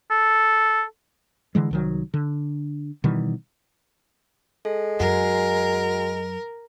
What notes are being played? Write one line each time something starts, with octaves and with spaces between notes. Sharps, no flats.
A4
D3 E3 G#3
C2 D#3 F#3
D3
B2 D#3 E3 G3
G#3 A4
F#2 F#4 A#4 F#5 G#5